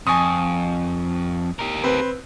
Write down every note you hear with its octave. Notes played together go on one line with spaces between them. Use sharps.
F2 G#5 C#6 D#6
G4 A#4
C4 B4